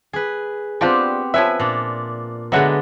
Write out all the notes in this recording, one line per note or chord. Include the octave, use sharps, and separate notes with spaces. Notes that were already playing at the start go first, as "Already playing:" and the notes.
G#4 B4
G3 B3 C4 D4 F4 G4
F3 C#4 B4 E5 G#5
A#2 D4
D3 F#3 G#3 B3 E5 F#5